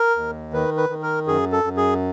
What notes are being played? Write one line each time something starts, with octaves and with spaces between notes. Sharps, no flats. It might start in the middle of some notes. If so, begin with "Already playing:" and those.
Already playing: A#4
D#2
D#3 B4
B4
D#3
A#4
F#2 G#4
A4
F#2
G#4